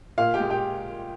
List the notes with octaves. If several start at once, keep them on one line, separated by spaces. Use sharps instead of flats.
A#2 F5
G4 G5
G#3
G4 G5